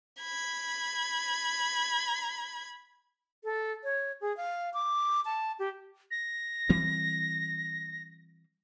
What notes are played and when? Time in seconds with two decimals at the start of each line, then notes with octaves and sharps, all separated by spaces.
0.21 B5 G#6
3.44 A4
3.84 C#5
4.21 G#4
4.37 F5
4.74 D6
5.25 A5
5.59 G4
6.11 A#6
6.69 E3 G3 C4